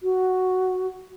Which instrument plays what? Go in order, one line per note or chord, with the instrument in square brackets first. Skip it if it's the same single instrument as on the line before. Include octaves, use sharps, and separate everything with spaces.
[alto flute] F#4